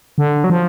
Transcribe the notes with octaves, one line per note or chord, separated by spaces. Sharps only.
D3
F#3
F3